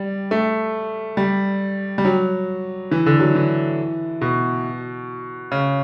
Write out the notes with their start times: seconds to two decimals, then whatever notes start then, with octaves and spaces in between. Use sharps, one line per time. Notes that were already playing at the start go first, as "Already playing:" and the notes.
Already playing: G3
0.31 A3
1.17 G3
1.98 G3
2.05 F#3
2.91 E3
3.06 D3
3.20 F#3
3.35 E3
4.21 B2
5.52 C#3